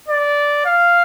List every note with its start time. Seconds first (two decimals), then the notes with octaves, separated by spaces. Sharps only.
0.08 D5
0.65 F5